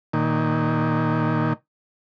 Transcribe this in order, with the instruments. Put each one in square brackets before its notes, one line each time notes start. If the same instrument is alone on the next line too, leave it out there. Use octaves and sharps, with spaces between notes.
[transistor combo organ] A#2 D#3